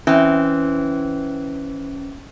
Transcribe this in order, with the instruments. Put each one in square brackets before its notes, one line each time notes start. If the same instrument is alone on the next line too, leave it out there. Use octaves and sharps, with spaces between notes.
[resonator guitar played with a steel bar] E3 C4 [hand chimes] C#4